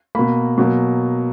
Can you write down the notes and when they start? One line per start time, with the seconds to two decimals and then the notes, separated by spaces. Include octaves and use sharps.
0.15 B2 A#3 B5
0.58 B2 F#3 A#3